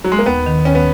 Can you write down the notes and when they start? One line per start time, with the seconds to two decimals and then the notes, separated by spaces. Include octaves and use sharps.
0.04 F#3
0.12 G#3
0.19 A#3
0.26 D#2 B3
0.46 D#3
0.65 D#2 C#4
0.75 B3